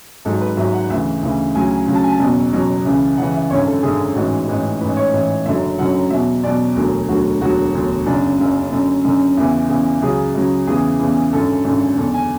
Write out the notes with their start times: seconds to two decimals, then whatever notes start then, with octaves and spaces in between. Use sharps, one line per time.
0.25 G#1 G#2 F#3 A4
0.41 B4
0.57 G#1 G#2 F#3 E5
0.73 F#5
0.90 D2 C#3 E3 E5
1.23 D2 C#3 E3
1.55 D2 C#3 F#3 G#5
1.71 G#5
1.87 D2 C#3 F#3
1.95 A5
2.04 G#5
2.11 A5
2.20 F#1 E2 B2 F#3
2.53 F#1 E2 B2 F#3
2.86 C#2 C#3 E3
3.17 C#2 C#3 E3 F#5
3.34 E5
3.50 G#1 F#2 D3 C#5
3.67 A4
3.83 G#1 F#2 D3 G#4
4.15 A1 G#2 E3 F#4
4.48 A1 G#2 E3
4.81 A1 G#2 E3 B4
4.97 C#5
5.13 A1 G#2 E3
5.46 F#1 F#2 D3 F#3 E5
5.78 F#1 F#2 D3 F#3 F#5
6.11 E2 B2 F#3 E5
6.44 E2 B2 F#3 D5
6.76 E1 D2 D3 F#3
7.09 E1 D2 D3 F#3 F#4
7.41 E1 D2 D3 F#3 F#4
7.74 E1 D2 D3 F#3
8.06 F#1 F#2 C#3 D4
8.40 F#1 F#2 C#3
8.71 F#1 F#2 D3
9.04 F#1 F#2 D3
9.37 E2 C#3 E3 E4
9.69 E2 C#3 E3
10.02 C#2 C#3 F#3 G#4
10.34 C#2 C#3 F#3
10.67 E2 C#3 E3 G#4
10.99 E2 C#3 E3
11.33 G#1 F#2 D3 A4
11.64 G#1 F#2 D3
11.98 F#1 E2 D3 A4
12.14 G#5